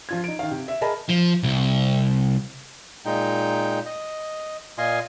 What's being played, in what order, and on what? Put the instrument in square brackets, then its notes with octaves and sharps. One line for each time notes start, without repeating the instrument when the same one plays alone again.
[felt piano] F3 F4 G#6
D#4 D7
D#3 F5
C3
E5
G#4 A#4 D#5 A5 B5
[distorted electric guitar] F3
C2
[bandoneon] A#2 G#3 D#4 G5
D#5
A#2 F4 D#5 G#5 C6